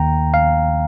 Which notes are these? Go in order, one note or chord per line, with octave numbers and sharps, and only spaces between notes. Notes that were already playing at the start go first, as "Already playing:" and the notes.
Already playing: D#2 D#3 A#3 G5 A#5
F5